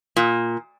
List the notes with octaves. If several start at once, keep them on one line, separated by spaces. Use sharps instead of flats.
A#2